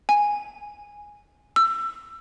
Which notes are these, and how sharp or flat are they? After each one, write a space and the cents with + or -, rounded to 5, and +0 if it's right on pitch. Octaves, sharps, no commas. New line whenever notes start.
G#5 -5
E6 +25